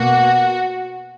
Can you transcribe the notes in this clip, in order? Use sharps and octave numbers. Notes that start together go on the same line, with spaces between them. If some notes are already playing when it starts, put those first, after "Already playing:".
Already playing: B2 A#3 F#4